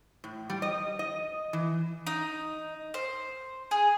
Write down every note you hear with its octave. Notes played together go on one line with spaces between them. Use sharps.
A2
G3
D#5
D#5
E3
D#4
C5
G#4